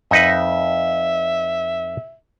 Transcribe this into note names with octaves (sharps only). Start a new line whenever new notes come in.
F2 D#4 B4 E5